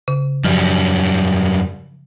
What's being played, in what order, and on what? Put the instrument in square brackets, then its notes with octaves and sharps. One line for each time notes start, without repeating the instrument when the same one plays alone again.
[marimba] C#3
[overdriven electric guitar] F#2 G3 [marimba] F3